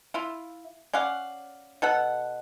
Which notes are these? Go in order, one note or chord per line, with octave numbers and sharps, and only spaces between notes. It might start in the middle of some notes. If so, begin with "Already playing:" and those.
E4 F4
C#4 D5 F5 F#5
B2 A4 F#5